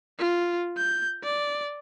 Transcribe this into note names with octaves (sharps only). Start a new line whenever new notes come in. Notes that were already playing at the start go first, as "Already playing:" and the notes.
F4
G6
D5